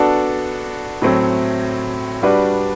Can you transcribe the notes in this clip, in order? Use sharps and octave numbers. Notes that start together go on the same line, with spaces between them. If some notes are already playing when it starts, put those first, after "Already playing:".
Already playing: B3 D4 F#4 A4 D5
A2 F#3 A3 C4
G3 D4 F#4 B4 D5